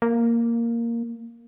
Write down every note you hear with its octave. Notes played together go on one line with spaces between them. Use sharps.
A#3